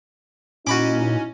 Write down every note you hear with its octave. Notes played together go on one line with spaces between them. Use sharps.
A#2 C#4 D#4 E4 F#4 B5 D6